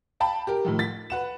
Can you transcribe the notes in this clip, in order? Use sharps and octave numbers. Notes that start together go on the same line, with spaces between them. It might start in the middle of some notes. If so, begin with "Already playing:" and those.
F5 G5 A5 B5
G4 A#4
A2 D#3 F3
A6 B6
B4 F#5 E7